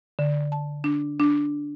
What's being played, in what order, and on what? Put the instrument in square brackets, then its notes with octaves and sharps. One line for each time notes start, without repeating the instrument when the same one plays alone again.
[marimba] D3
A5
D4
D4